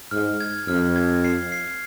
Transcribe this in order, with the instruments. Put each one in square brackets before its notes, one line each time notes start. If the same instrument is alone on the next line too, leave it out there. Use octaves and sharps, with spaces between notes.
[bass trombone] G#2 [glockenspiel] F6
[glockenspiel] G#6
[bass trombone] F2 [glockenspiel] F6
[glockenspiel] G#6
C7
C7